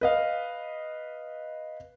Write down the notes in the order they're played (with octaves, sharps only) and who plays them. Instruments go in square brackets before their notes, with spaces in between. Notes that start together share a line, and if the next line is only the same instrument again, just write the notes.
[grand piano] B4 D#5 F5